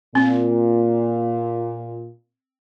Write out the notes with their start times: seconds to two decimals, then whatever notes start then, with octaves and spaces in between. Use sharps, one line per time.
0.15 A#2 C4